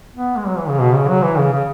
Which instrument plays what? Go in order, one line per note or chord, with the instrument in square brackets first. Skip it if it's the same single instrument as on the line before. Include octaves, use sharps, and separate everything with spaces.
[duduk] B3
G#3
F#3
E3
C#3
B2
C#3
F#3
E3
C#3
C#3